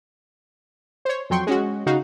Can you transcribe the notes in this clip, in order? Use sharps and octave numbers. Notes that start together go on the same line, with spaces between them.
C5 C#5
F2 F#3 G5 C6 C#6
G#3 C#4 F#4
C#3 D#4 F#4 F5